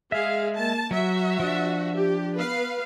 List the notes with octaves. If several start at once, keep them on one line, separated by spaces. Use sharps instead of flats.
G#3 G#4 E5 F5
A#3 A5
F#3 F#4 E5
F3 D4
G4
B3 B4 F5